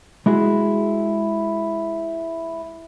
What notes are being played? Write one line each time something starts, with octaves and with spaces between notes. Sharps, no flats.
G#3 E4 F#4 G#4